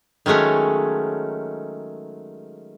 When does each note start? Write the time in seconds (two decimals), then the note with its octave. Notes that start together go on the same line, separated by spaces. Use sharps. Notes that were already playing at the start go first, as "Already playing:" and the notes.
0.26 D#3 F#3 G#3 A3 C#4